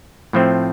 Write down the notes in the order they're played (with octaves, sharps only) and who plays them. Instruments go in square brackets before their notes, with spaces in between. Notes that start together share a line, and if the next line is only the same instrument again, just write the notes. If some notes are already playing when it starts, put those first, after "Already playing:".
[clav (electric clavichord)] A2 F3 A3 C4